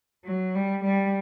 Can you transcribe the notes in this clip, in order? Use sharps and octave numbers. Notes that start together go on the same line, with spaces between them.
F#3
G3
G3